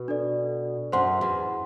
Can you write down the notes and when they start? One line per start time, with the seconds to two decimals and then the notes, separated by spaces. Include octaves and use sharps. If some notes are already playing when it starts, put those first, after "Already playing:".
Already playing: B2
0.08 D4 A4 D5
0.92 F#2 C5 F#5 C6
1.21 E2